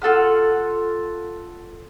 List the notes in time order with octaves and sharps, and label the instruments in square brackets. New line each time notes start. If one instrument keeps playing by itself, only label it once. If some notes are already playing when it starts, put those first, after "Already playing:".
[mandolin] F4 A4 F#5 F6